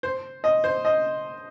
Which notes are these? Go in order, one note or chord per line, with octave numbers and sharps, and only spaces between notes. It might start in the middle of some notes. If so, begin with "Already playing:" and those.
C5
D#5
C5
D#5